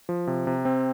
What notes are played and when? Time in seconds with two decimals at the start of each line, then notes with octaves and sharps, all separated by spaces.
0.09 F3
0.27 C3
0.47 C3
0.65 C4